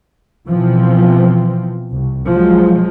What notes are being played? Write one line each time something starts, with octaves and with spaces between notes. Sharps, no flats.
B2 E3 F3 C4
C2
F3 F#3 G#3